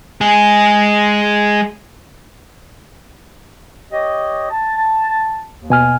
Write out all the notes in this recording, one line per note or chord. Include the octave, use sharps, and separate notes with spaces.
G#3 G#4
G4 C#5 D#5
A5
D#2
B2 G#5 F6